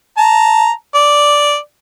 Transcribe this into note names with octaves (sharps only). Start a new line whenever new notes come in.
A5 A#5
D5